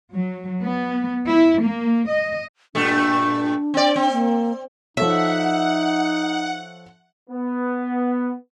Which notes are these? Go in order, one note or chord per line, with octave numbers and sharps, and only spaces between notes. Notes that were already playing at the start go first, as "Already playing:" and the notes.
F#3
B3
E4
A#3
D#5
G2 A#2 A3 D4
C4 D5
C4
A#3
F3 D#4 A4 C#5 E5 F#5
B3